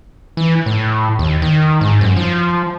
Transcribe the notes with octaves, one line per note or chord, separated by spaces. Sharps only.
E3
A2
D#2
D#3
G#2
F#2
F3